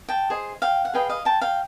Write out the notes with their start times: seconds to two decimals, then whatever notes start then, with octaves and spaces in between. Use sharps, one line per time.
0.09 G5 A5
0.30 G#4 C5 D#5
0.62 F5 G5
0.85 F#5
0.93 G#4 B4 D#5 F5 G5
1.09 D#5 F5
1.25 G5 A5
1.41 F5 G5